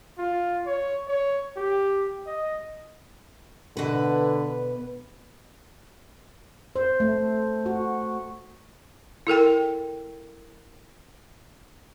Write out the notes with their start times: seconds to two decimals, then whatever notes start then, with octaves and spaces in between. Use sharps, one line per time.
0.18 F4
0.66 C#5
1.08 C#5
1.56 G4
2.26 D#5
3.77 B2 D3 B4
6.76 C5
7.00 A3
7.66 F#4
9.27 E4 A4 A#4 G5